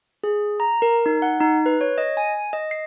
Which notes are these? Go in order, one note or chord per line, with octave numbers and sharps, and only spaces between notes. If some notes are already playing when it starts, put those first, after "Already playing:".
G#4
A#5
A#4
D#4
F#5
D#4
B4
C#5
D#5
G#5
D#5
C7